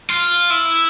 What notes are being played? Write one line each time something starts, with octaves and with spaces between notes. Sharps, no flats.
F4
E4